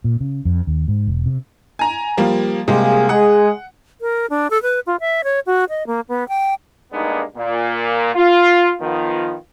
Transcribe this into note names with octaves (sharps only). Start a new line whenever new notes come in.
A#2
C#3
F2
D#2
G#2
E1
C3
G#5 A#5
F3 G3 A#3
C3 G3 G#3 A#3 F4 G#4
G#3 G#4 F#5
A#4
D4
A4
B4
F4
E5
C#5
F#4
D#5
A#3
B3
G5
G2 G#3 A#3 B3 D4 D#4
A#2
F4
D#3 F3 B3 F4